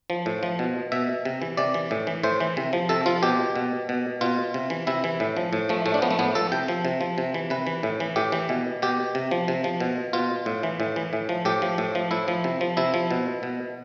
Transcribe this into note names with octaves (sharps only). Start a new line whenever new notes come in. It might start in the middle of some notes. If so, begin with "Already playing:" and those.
F3
A2
F3
B2
B2 E5
C3
E3
C3 D5
E3
A2
E3
A2 C5
E3
C3
F3
C3 A4
F3 F4
B2 G4
B2
B2
B2 F4
C3
E3
C3 E4
E3
A2
F3
A2
F3 A3
A2 A3
D4
F3 B3
A3
A2 B3
F3 A4
C3 G5
F3
C3
F3
C3
E3
C3 B4
E3
A2
E3
A2 G4
E3
B2
B2 G4
C3
F3
C3
F3
B2
B2 F4
A2
E3
A2
E3
A2
F3
A2 G4
F3
A2
F3
A2 E4
F3
C3
F3
C3 E4
F3
B2
B2